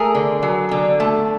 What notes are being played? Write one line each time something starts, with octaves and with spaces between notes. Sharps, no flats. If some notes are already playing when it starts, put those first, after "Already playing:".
Already playing: A3 G#4 A#4
D3
F#3
D3
A3